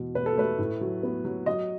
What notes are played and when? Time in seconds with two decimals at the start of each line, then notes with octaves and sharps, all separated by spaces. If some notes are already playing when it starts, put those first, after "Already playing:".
Already playing: E2 B2
0.15 B2 B4
0.26 A4
0.37 A3 B4
0.59 A2
0.81 F#3
1.03 B3
1.25 F#3
1.46 F#3 D#5